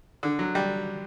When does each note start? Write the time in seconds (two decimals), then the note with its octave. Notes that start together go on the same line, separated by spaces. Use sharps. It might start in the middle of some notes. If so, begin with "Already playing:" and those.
0.23 D3
0.39 F#3
0.55 G3